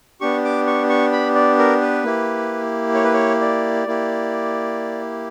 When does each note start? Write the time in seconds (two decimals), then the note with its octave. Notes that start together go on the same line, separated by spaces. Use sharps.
0.21 B3 D4 G4 C#6
0.45 D6
0.67 C#6
0.90 C#6
1.12 B5
1.35 D5
1.58 A#4
1.81 B4
2.04 A#3 E4 G4
2.95 C#5
3.04 B4
3.14 C#5
3.41 D5
3.87 A#3 E4 G4